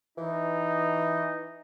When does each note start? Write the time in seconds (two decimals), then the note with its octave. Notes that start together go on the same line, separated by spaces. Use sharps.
0.18 E3 D#4